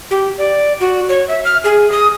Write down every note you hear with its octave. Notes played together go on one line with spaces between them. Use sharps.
G4
D5
F#4
C#5
E5
F6
G#4
D#6